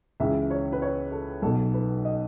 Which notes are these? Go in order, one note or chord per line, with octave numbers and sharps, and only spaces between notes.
C#2 C#3 E3 E5
C#5
B4
C#5
A4
B1 B2 A4
B4
D#5